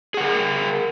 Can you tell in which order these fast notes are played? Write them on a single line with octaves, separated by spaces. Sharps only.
G#4 F#5 A#4